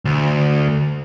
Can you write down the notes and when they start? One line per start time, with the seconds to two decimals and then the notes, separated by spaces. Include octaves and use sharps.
0.05 D2